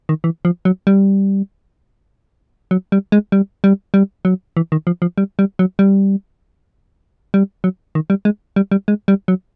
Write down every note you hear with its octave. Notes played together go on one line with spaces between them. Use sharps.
D#3
E3
F3
F#3
G3
F#3
G3
G#3
G3
G3
G3
F#3
E3
D#3
F3
F3
G3
G3
F#3
G3
G3
F#3
D#3
G3
G#3
G3
G3
G#3
G3
F#3